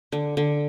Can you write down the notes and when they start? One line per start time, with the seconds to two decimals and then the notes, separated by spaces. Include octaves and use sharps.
0.12 D3
0.37 D3